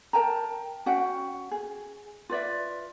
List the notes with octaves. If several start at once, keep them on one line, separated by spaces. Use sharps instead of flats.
A#4 G5 A5 A#5
C#4 F#4 F#5 G5
G#4
F4 B4 D5 E5